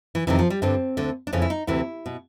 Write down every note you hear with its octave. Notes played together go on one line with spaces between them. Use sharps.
E3
F2 C3 D#3 E3
F3
G3
G2 D3 C4
D2 D3
D4
F2 C#3 E3 C#4
E4
D#4
D2 C3 E3 E4
B2